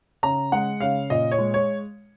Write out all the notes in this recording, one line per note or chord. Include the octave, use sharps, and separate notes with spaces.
C#3 A#5
G#3 F#5
C#3 F5
A#2 D#5
C#5
G#3
C#5